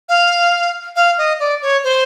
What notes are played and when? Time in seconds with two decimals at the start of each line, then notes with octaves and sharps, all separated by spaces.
0.09 F5
0.96 F5
1.18 D#5
1.40 D5
1.62 C#5
1.84 C5